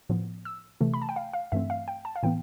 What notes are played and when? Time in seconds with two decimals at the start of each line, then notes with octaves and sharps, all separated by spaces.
0.09 A2 F3 B3
0.45 E6
0.81 C3 E3 A3
0.94 B5
1.02 A5
1.09 G5
1.16 F5
1.33 F5
1.52 G2 E3 A3 C4 E5
1.70 F5
1.88 G5
2.05 A5
2.16 F5
2.23 A2 E3 B3 G5